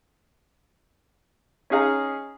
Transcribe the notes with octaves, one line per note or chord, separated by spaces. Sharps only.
C#4 D#4 G#4 F5 A#5